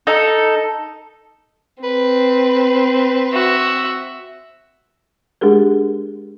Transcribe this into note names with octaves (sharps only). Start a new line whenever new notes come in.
D#4 A4
C4 B4
F#4 E5
G#3 D4 G4 G#4 A#4